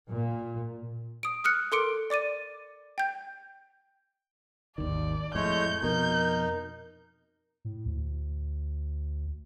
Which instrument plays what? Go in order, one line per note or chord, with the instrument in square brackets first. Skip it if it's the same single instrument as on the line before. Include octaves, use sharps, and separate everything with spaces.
[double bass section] A#2
[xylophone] D#6 D7
D#6 F6 F#6 C#7
A4 A#4 C6 D6 C#7 D7
D5 D6 A6 D#7
G5 G6
[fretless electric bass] G#1 D#2 D#3 [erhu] D5
[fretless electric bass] F2 A2 [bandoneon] G#3 A3 C#5 [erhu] G6
[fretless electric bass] F2 B2 [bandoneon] D#4 [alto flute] A#4 [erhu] G6
[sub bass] A2
D2